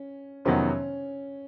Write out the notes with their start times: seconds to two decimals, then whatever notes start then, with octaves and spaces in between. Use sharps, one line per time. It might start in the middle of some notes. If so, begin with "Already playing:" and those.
Already playing: C#4
0.45 F2 C3 D#3 F#3 B3 C#4